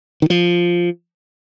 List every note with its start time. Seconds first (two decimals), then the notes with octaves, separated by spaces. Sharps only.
0.22 D#3
0.30 F3